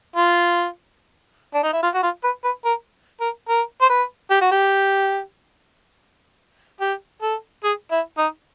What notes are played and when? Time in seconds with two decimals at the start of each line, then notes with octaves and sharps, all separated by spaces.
0.16 F4
1.54 D4
1.63 D#4
1.73 E4
1.83 F4
1.94 F#4
2.03 F4
2.24 B4
2.44 B4
2.65 A#4
3.21 A#4
3.49 A#4
3.81 C5
3.90 B4
4.31 G4
4.41 F#4
4.51 G4
6.80 G4
7.22 A4
7.64 G#4
7.92 E4
8.18 D#4